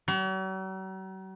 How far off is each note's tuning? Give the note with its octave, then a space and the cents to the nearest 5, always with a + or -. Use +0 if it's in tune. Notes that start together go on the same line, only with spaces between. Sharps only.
F#3 +45